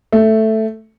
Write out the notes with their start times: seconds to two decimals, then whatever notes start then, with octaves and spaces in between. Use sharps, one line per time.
0.12 A3